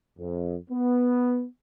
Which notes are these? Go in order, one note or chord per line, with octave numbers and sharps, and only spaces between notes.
F2
B3